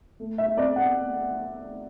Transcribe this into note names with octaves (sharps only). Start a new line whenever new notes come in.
A3
E5
C4 D5
F#5